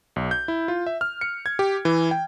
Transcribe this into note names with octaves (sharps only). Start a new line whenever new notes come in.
B1
G6
E4
F4
E5
F6
C#7
G#6
G4
E3
G5